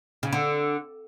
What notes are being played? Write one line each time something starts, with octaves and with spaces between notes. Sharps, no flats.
C#3
D3